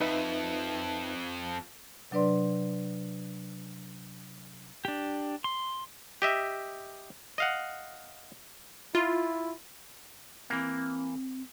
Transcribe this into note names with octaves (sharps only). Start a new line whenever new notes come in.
F2 D#4 B4 E5
C3 F#3 D4 B4 D5 C6
D4 G4
C6
G4 D#5 E5
D#5 F5 F#5
E4 F4
E3 A#3 C4